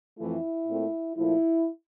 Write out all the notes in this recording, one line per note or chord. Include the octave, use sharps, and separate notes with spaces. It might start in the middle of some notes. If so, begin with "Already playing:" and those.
F2 E3 A3 E4
A#2 A3 C4
A#2 F3 A3 E4